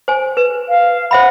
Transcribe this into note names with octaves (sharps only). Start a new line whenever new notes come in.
C5 G#5
B4
F5
C5 E5 F#5 B5